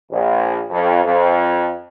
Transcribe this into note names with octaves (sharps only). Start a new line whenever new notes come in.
A#1
F2
F2